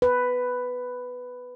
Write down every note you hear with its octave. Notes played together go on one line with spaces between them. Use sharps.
B4